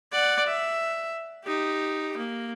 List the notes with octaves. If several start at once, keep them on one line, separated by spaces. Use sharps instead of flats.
D5 F#5
E5
D#4 G4
A#3